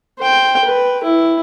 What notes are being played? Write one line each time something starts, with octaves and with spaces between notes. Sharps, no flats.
C5 G5
B4
E4